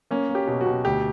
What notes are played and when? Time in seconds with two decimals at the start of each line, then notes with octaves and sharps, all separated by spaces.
0.11 A#3 C#4
0.29 A#3
0.35 G4
0.47 B2
0.61 F#4
0.66 B2
0.85 D2 G4